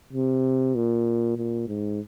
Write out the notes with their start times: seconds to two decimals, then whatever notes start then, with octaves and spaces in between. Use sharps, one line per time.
0.13 C3
0.75 A#2
1.37 A#2
1.68 G#2